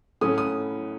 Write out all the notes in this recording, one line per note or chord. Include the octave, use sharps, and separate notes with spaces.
A2 F#3 A3 C#4 D#6
D#6